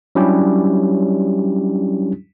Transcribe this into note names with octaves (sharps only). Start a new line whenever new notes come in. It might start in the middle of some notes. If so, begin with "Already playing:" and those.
F#3 G3 C#4 D4 E4 G4